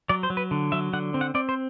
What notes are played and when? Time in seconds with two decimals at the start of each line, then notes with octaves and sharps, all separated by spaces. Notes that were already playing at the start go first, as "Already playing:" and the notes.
0.09 F#3 D5
0.23 C5
0.30 F#3
0.37 B4
0.51 D3
0.72 F#3 E5
0.93 D3 F#5
1.14 C4
1.21 F#5
1.35 C4 D5
1.49 C5